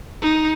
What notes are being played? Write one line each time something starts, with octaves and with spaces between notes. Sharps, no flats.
D#4